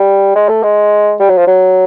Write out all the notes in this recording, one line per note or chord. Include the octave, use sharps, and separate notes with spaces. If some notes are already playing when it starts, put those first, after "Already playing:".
Already playing: G3
G#3
A3
G#3
G3
F#3
F3
F#3